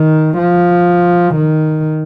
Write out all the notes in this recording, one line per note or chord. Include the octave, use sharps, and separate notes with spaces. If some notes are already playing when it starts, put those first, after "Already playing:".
Already playing: D#3
F3
D#3